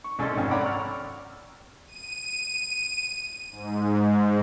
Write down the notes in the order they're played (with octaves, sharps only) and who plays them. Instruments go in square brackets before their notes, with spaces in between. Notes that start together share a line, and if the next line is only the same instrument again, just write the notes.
[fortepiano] C#6
C2 C#4 G#4 A4 D#5 C6
G#1 F2 C#4
C#5 D5 F#5 A#5 B5 D6
C#6 E6 F6
[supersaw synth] D#7
G#2